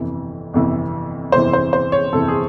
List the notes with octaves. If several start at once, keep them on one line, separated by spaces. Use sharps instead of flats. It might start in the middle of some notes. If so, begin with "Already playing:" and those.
Already playing: G1 F2 C3 E3
G1 F2 C3 E3
G1 F2 C3 E3 C5
C5
C5
C#5
G1 F2 C3 E3 A4
G#4